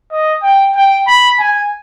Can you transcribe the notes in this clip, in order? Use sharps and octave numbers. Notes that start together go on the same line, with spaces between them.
D#5
G5
G5
B5
G#5